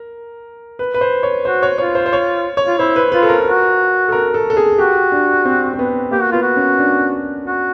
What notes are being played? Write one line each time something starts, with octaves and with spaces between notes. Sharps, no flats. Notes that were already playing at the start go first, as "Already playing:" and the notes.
Already playing: A#4
B4
B4
C5
C#5
F#4 C5
C#5
F4 C#5
C5
C5
C#5
C#5
F4
E4 C5
B4
F4 B4
A4
A#4
F#4
A4
A#4
A4
A4
G#4
F#4 G4
D4
C4
C4
B3
A#3 G4
F#4
B3 F4
F#4
C#4
D4
F#4